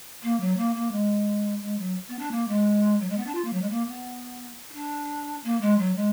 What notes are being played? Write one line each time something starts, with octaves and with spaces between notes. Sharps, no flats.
A#3
F#3
A#3
A#3
G#3
G#3
F#3
B3
D4
A#3
G#3
F#3
G#3
B3
D4
F4
A#3
F#3
G#3
A#3
B3
D#4
D4
A#3
G#3
F#3
G#3